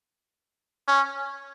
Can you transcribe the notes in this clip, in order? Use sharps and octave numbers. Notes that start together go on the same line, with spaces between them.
C#4